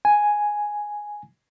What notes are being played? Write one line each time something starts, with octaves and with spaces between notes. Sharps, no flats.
G#5